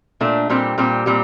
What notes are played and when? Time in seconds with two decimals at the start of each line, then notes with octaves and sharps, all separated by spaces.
0.20 A#2 A3 D4
0.50 A#2 G3 C4 G4
0.78 A#2 G3 C4 G4
1.06 A#2 G3 C4 G4